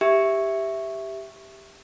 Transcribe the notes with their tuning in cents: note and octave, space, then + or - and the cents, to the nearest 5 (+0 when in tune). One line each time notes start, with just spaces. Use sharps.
G4 +5 E5 +0